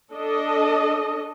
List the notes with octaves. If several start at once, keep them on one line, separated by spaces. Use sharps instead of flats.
D4 A4 D#5